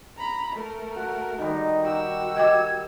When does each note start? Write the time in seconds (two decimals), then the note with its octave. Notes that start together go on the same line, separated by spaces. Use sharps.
0.17 A#5 B5
0.55 A3 A#4
0.96 F#4
1.38 D#3 G3 D#4
1.83 F#4 G4 E6
2.37 D#5 G5 D6 G#6